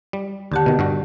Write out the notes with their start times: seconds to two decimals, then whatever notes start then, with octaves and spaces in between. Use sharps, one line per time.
0.13 G3
0.52 D#2 D3 G4 F#5 A5
0.66 B2 D#3
0.79 G2 G3 F#4